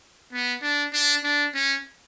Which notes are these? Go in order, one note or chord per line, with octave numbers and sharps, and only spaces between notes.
B3
D4
D4
D4
C#4